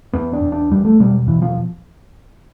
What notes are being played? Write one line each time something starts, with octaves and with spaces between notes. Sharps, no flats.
E2 B3
D4
E2
D4
E2 G3
A3
B2 G3
E2 E3
F3